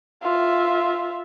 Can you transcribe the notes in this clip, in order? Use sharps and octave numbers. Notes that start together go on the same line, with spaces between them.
F4 E5